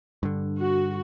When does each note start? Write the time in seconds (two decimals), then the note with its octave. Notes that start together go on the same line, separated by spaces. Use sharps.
0.23 G2 D3
0.59 F#4